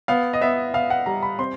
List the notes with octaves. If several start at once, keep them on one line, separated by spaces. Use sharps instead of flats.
B3 F5
D#5
B3 E5
B3 F5
F#5
G3 A#5
B5
C4 C6